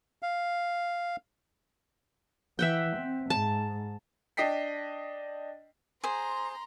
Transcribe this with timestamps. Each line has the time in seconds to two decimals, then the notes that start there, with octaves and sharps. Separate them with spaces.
0.22 F5
2.59 E3 E5 F#5 G5
2.96 C4
3.30 G#2 A5
4.37 D4 D#5 G5 B6 C7
6.04 G#4 C5 A#5 C6